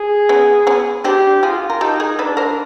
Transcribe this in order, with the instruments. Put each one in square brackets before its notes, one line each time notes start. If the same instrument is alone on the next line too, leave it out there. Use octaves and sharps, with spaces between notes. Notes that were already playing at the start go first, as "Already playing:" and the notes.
Already playing: [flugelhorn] G#4
[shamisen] B3 C#4
B3 C#4
[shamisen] C4 D4 [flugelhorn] G4
[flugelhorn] F4 [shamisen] F#4 G#4
[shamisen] A#4
[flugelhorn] D#4 [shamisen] G4 A4
[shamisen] G#4 A#4
[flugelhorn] D4 [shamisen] A4 B4
[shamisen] A#4 C5